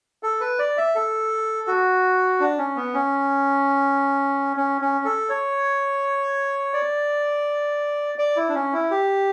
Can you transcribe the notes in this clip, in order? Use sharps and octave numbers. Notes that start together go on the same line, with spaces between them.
A4
B4
D5
E5
A4
F#4
D4
C#4
B3
C#4
C#4
C#4
A4
C#5
D5
D5
E4
D4
C#4
E4
G4